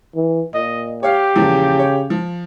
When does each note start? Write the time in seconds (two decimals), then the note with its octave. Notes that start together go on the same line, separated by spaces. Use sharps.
0.15 E3
0.54 A#2 D#5
1.03 G4 C#5 F5
1.36 E2 A#2 C#3 F3
1.79 C#5
2.10 F3